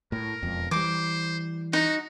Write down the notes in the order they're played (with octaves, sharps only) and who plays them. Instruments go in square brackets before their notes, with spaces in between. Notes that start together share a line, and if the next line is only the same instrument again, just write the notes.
[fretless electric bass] A2 [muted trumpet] A#4
[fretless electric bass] E1 F2
[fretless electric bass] E3 G3 [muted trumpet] C5 [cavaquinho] D6
[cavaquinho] D#4 [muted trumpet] F#4